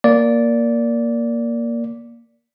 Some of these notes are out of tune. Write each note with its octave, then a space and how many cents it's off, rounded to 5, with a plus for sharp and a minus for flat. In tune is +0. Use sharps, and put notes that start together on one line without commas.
A#3 +0 D5 -15